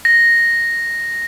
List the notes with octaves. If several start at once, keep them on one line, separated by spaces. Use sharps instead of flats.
A#6